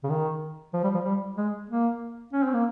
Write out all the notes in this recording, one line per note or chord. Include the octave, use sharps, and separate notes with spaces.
C#3
D#3
F3
G3
F3
G3
G#3
A#3
C#4
C4
A#3